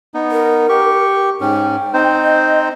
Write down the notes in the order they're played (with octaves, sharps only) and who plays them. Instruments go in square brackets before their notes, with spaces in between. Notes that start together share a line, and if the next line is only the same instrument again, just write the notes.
[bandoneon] B3 D#4
[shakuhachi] A#4
[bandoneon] G4 C#6
[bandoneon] G#2 C#4 [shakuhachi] G5
[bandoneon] C4 D#4 C5
[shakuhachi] D#5